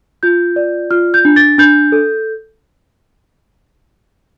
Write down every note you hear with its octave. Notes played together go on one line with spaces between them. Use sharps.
F4 G6
D5
F4 F6
G6
D4
A6
D4 G6
A4